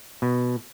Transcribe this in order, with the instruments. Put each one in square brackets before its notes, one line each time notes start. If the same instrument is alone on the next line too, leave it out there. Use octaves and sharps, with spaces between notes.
[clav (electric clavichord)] B2